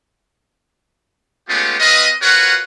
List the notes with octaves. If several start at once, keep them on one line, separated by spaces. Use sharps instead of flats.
G#3 A3 B3 C#4 F4 G4
C4 F4 B4 D#5
F4 F#4 A#4 B4 C#5 F#5